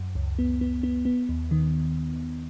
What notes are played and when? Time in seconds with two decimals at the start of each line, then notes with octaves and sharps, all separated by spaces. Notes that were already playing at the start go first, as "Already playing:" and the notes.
Already playing: F#2
0.15 C#2
0.39 B3
0.61 B3
0.83 B3
1.05 B3
1.29 D#2
1.51 D#3